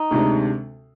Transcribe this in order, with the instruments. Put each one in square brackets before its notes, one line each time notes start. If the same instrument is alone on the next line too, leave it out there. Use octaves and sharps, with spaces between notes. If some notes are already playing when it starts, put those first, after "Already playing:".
Already playing: [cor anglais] D#4
[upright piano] D2 C3 D#3 G#3 D4